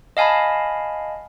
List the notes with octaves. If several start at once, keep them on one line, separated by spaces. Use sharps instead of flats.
D#5 F5 G#5 A5 B5